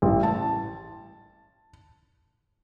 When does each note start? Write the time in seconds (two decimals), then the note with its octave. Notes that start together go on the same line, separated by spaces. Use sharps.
0.02 A1
0.23 A5